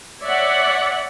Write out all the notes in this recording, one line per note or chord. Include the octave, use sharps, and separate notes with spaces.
C#5 D5 E5 F#5